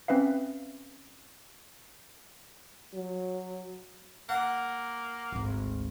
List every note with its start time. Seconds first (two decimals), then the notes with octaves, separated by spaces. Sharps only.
0.08 C4 C#4 B4 E5 F5
2.94 F#3
4.29 A#3 F#5
5.32 G#1 D2